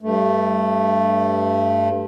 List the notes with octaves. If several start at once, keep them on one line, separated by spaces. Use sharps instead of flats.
G2 A3